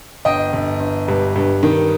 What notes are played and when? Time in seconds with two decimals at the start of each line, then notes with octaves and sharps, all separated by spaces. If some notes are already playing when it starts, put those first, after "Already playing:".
0.25 G1 D#5 G5
0.53 G1
0.80 G1
1.08 G2
1.36 G2
1.63 D#3